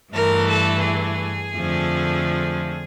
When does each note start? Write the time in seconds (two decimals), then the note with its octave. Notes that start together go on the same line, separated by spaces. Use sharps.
0.13 G2 E3 A3 A#4
0.49 A4
0.84 G#4
1.56 F2 D3 F3 A3